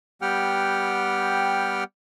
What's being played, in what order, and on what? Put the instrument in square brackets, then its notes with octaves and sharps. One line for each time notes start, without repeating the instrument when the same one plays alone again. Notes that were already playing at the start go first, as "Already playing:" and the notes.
[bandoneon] G3 B3 G4 F#5 G5 F6